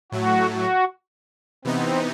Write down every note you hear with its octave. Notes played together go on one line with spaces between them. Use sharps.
A2 F#3 A3 F#4
F#4
C3 E3 B3 C4 D#4